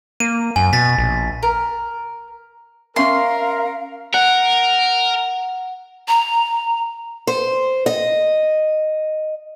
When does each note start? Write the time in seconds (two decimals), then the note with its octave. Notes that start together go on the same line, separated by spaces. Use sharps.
0.20 A#3 D#7
0.56 F#2 G#5
0.73 B2 A6 B6
0.98 A#1
1.43 A#4
2.96 C#4 A#4 E5 F5 C6
4.14 A#4 F#5
6.08 A#5
7.27 C5
7.86 D#5